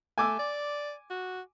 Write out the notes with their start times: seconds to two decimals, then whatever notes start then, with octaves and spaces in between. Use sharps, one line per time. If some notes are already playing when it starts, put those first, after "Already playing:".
0.18 A3 G#5 D6 E6
0.39 D5
1.10 F#4